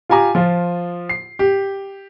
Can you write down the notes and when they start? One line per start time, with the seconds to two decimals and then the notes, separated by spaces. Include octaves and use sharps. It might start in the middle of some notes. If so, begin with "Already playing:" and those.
0.10 F4 G4 G#5 A#5 D6
0.35 F3 F4
1.09 C7
1.39 G4